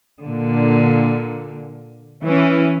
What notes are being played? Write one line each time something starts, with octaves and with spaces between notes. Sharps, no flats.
A#2 D3
E3 C#4